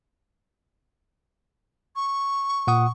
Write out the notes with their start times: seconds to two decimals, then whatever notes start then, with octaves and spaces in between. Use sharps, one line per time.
1.96 C#6
2.67 A#2 F#5 D#6